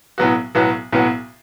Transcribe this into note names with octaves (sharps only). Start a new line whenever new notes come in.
B1 A2 F#3 B3 F#4
B1 A2 F#3 B3 F#4
B1 A2 F#3 B3 F#4